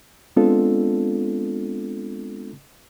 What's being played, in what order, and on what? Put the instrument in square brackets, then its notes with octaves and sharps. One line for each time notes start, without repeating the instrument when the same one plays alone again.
[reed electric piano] G#3 B3 C4 D4 F4 A4